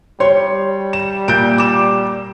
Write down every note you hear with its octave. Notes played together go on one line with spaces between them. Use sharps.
G3 C#5 C6
E7
A#2 G6 D7
D6 E7